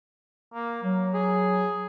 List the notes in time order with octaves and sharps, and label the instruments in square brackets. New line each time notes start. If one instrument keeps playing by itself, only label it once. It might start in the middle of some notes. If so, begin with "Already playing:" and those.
[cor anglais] A#3
[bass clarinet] F#3 [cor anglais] A#3
[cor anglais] G#4